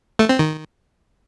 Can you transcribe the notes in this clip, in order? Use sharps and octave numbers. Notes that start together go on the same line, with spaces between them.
A3
C4
D#3